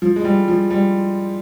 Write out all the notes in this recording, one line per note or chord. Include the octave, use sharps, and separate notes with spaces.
F3
G#3
G3
F3
G3